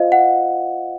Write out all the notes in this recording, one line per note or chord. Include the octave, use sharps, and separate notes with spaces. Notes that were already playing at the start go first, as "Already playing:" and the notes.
Already playing: F4 C5 D#5 F5
F#5